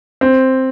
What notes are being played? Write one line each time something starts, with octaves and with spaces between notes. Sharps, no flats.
C4